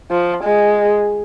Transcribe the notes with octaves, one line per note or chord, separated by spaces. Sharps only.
F3
G#3